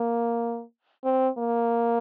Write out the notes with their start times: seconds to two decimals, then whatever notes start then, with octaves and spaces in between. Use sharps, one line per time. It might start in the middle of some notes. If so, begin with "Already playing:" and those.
Already playing: A#3
1.04 C4
1.38 A#3